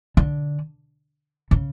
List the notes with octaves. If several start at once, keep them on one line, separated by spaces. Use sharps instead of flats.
D3
C#3